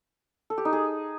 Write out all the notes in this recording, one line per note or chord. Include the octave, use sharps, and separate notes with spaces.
A4
G4
D#4
G#4